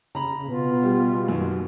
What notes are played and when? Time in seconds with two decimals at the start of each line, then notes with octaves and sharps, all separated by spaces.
0.15 C#3 A#5 B5
0.48 B2 B3 F4
0.83 G3
1.28 F#2 D#3